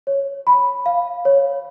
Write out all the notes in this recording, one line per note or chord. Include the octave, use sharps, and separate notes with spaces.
C#5
B5
F5
C#5